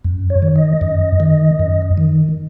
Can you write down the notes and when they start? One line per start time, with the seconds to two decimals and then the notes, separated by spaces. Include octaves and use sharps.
0.05 F#2
0.30 C#5
0.42 D#3
0.56 D#5
0.81 F#2
1.20 D#3
1.59 F#2
1.98 D#3